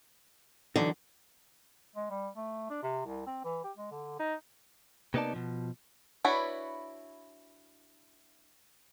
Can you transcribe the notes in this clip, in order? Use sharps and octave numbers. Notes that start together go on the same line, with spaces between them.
D3 E3 F#3 D#4
G#3
G3
A3
D4
C3
C2
C4
E3
G4
G#3
D3
D#4
C3 A#3 B3 D#4 D5 A5
B2 F3
D4 E4 F#4 B4 C#5